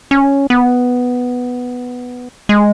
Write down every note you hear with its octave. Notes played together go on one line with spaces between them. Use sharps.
C#4
B3
G#3